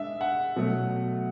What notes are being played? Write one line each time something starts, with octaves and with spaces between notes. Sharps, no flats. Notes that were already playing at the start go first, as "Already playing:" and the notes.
Already playing: G#3 D4 E5
F#5
B2 F#3 A3